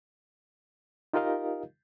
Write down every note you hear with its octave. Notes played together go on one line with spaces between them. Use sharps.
D#4 F4 G4 A#4 D#5 F5